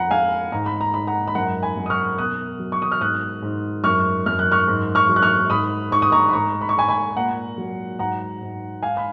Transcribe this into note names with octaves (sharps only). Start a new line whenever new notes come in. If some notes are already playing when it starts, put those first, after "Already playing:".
Already playing: F2 F#5 A#5 B5
G#3 F5 G#5
G#2 A#5
B5
A#5
G#2 B5
F#5 A#5
B5
F#2 F#5 A#5
G#5 B5
F#2
D#6
C#6 F6
B2 D#6 F#6
F#3
C#6
D#6
F6
G#2 D#6 F#6
G#2
F#2 C#6 F6
F#2 F6
F#6
C#6 F6
G#2
C#6 F6
F#3
F#6
C#6 F6
G#2 B5 D#6
G#2 C#6
D#6
A#5 C#6
B5
G#2 A#5 C#6
B5
C#6
G#2 G#5 B5
G#5 B5
A#2 F#5 A#5
F#3
G#2 F#5 A#5
G#2
G#2 F5 G#5
B5